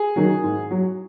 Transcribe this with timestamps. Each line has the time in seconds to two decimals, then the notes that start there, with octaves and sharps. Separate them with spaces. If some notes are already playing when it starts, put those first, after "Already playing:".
Already playing: G#4
0.16 D#3 F#3
0.44 G#2
0.71 F#3